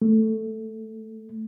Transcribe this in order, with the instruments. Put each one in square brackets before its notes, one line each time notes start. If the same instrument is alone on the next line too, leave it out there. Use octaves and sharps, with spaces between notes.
[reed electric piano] A3